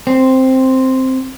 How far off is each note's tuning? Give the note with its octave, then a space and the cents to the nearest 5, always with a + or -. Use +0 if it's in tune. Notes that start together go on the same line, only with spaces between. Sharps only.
C4 +0